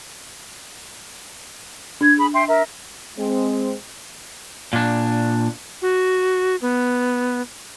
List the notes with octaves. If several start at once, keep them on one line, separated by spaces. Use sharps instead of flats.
D4 G#6
G#4 B5
E5 G5 C6
A#4 E5
G#3 C4
A#2 D4
F#4
B3